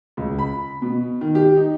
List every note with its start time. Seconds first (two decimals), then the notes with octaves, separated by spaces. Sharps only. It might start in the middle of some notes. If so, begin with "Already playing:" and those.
0.17 C#2
0.39 B5
0.82 B2
1.21 D#3
1.35 G4
1.57 D#4